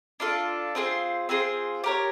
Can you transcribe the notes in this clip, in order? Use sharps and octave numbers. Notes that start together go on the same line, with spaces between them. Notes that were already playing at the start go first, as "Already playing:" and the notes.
D4 F4 A4
C4 F4 G#4 C5
C4 F4 G#4 C5
G4 A#4 C#5